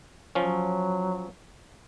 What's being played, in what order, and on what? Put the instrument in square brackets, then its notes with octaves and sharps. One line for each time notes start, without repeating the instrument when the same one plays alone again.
[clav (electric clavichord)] F3 C#4 [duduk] F#3